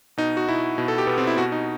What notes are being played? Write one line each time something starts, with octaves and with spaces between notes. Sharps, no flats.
B2 D#4
F#4
B2 E4
B2
A4
G4
B2 B3
C4
E4
B2 F#4
D#4